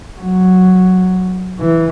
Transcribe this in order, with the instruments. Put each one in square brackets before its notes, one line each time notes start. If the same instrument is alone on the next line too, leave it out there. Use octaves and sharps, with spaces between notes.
[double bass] F#3
E3